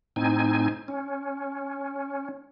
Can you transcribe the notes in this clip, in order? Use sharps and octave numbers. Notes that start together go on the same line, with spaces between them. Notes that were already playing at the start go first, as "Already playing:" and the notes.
A2 C4 D#4 G#5
C#4